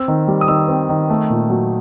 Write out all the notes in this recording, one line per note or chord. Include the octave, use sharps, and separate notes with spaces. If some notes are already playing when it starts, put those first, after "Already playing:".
Already playing: C4 E6
D#3
G3
D#6
D#3 E6
C4
D#3
A3
A#2
F#3